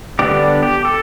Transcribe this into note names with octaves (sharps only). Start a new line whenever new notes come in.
D3 G3 B3 D4 G4
G4
A4